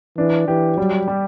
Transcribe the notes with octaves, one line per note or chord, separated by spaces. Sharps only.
E3 D4
E3 G4
F#3 G3
G3